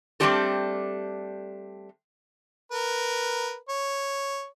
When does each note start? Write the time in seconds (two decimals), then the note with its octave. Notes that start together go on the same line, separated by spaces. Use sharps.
0.20 G3 A3 C4 D4 G4 A4
2.72 A#4 B4
3.69 C#5